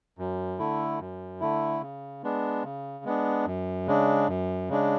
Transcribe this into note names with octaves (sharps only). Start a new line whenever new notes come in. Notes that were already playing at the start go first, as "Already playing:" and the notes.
F#2
D3 A3 E4
F#2
D3 A3 E4
C#3
G#3 B3 D4
C#3
G#3 B3 D4
F#2
C#3 G#3 D4
F#2
C#3 G#3 D4